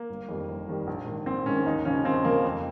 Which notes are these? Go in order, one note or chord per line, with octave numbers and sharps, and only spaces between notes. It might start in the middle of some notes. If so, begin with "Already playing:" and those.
Already playing: A#3
G1
F2 D#3 G3
G1
F2 D#3 G3
A#1
G#2 D#3
A#1 C4
G#2 D#3 C#4
D#2 D#4
C#3 F3 C#4
D#2 C4
C#3 F3 A#3
F2